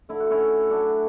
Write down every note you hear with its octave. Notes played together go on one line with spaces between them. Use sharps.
D3 A3 E4
F#4
C#4 E4
D3 F#3 A3 D4 F#4